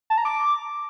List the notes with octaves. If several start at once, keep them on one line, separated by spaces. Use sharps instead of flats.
A5
A#5
D6